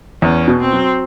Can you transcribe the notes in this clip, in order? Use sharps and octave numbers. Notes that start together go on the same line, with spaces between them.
E2 C#4
B2
C4
F#3